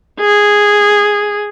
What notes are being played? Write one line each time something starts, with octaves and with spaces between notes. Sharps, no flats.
G#4